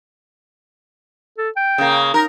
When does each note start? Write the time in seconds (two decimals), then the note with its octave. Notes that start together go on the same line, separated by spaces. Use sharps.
1.38 A4
1.56 G5
1.78 C#3 A#3
2.14 D#4 A#4